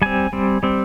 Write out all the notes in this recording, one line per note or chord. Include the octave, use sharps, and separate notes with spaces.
G3 C4 G#5
G3 C4
G3 C4